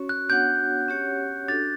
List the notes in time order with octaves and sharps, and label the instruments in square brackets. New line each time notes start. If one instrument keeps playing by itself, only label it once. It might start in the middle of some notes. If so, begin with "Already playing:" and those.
Already playing: [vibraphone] C#4 F#4 C#5
[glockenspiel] F#6
[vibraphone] B3 D4 F#4 C#5 F#5 [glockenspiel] G6
[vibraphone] C#4 G4 C#5 F#5
[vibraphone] D4 F#4 A4 [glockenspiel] A6